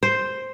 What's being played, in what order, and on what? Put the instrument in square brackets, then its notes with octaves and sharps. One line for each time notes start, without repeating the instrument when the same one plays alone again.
[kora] C5